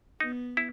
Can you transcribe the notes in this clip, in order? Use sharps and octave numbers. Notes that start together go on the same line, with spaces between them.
B3 D#4
E4